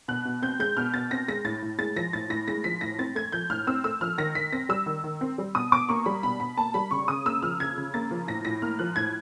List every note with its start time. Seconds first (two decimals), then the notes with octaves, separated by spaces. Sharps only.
0.08 B2 F#6
0.25 B2
0.42 C4 G6
0.59 G#3 G6
0.77 B2 F6
0.93 B2 A6
1.11 C4 A#6
1.28 G#3 A#6
1.44 A2 A6
1.62 A2
1.78 G#3 A6
1.96 F3 A#6
2.13 A2 A6
2.30 A2 A#6
2.47 G#3 A#6
2.64 F3 B6
2.81 A2 A#6
2.99 C4 A6
3.15 A3 G#6
3.32 F3 G6
3.50 A2 F6
3.67 C4 E6
3.84 A3 E6
4.01 F3 F6
4.18 D#3 A#6
4.35 D#3 B6
4.52 C4 A#6
4.69 G3 E6
4.86 D#3
5.04 D#3
5.21 C4
5.38 G3
5.55 B2 D#6
5.72 B2 D6
5.89 A#3 C#6
6.06 G3 B5
6.23 B2 B5
6.40 B2 B5
6.57 A#3 A5
6.74 G3 B5
6.91 C#3 C#6
7.08 C#3 D#6
7.25 A#3 E6
7.42 F3 F6
7.59 C#3 G#6
7.77 C#3
7.94 A#3 A6
8.11 F3
8.28 A2 A#6
8.45 A2 A#6
8.62 A#3 F6
8.79 F3 F#6
8.96 A2 G#6